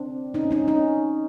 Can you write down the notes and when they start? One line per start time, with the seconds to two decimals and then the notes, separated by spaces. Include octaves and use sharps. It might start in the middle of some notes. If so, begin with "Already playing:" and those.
Already playing: C4 D4
0.34 C#4 D#4
0.51 C#4 D#4
0.68 C#4 D#4